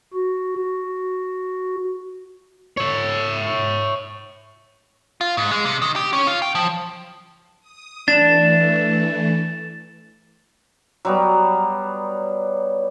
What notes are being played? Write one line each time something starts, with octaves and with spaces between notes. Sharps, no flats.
F#4
F#4
C#5 E5
F4
G#2
G#3
C3
D#3
G4
C#4
F4
G5
F3
D#6
E3 A3 D4 A6 E7
F#3 G3 B3